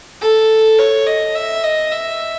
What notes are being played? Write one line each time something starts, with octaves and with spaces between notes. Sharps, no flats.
A4
C#5
D#5
E5
D#5
E5